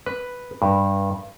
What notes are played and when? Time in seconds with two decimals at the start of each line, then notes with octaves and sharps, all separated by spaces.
0.06 B4
0.62 G2